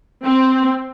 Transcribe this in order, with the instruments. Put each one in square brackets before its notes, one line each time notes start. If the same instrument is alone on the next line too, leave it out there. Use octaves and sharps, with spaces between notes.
[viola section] C4